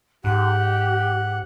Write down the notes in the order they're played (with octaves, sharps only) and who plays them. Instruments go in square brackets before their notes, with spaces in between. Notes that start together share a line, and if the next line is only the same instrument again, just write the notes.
[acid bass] G#2 [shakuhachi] G4 [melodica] F#5